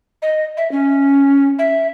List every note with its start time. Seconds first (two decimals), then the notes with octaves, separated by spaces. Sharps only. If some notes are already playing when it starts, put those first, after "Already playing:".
0.22 D#5
0.57 E5
0.72 C#4
1.59 E5